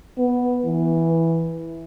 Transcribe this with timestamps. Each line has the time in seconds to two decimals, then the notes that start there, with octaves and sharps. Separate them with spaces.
0.18 B3
0.65 E3